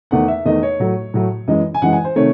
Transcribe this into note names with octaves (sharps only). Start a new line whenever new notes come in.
E2 D#3 A3 F#5
E5
E2 D#3 A3 D#5
C#5
A2 F#3 A3
A2 F#3 A3
F#2 E3 G#3 D#5
G#5
F#2 E3 G#3 F#5
G#5
C5
C3 D#3 A3 C#5